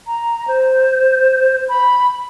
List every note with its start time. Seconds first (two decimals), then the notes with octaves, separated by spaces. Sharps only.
0.07 A#5
0.48 C5
1.69 B5